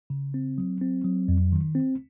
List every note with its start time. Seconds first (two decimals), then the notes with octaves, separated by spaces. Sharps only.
0.10 C#3
0.34 C4
0.58 F#3
0.82 C4
1.05 F#3
1.28 F2
1.52 D#3
1.75 C4